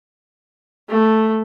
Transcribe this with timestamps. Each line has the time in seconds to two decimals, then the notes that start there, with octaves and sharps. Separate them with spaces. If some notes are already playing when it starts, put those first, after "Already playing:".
0.88 A3